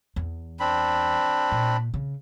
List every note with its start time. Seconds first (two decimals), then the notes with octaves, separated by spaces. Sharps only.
0.16 E2
0.60 C4 D4 B5
1.52 A#2
1.94 C#3